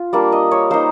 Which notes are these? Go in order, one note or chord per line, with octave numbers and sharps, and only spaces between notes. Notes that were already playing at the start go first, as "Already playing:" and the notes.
Already playing: F4
G3 A#3 D4 D5
D#5
C#5
A#3 D#4 C5